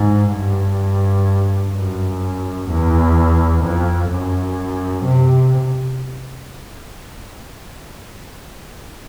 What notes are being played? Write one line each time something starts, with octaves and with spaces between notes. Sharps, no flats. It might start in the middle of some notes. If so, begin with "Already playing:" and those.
Already playing: G#2
G2
F#2
E2
F2
F#2
C3